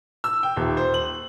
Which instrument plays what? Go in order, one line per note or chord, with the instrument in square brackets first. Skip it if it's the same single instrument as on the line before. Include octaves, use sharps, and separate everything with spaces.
[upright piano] E6
G5
D#1
C5
F#7